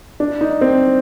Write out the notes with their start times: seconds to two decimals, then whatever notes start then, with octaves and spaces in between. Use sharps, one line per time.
0.20 D4
0.41 D#4
0.61 C4